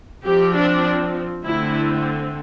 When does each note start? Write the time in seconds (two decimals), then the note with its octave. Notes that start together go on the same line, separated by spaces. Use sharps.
0.25 F3 C4 G4
0.55 D4
1.44 D3 A3 C4 E4